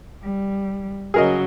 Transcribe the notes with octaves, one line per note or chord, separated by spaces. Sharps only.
G3
C#3 F#3 G#4 A#4 D#5